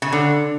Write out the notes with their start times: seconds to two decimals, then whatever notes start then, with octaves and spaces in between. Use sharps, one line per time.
0.02 C#3
0.12 D3